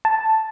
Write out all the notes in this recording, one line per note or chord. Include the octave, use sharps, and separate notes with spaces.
A5